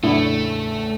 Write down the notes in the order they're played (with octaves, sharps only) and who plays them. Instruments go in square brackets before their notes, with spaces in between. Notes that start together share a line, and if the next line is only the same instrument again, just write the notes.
[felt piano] E2 A2 C#3 [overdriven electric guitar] A3 [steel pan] D4 E4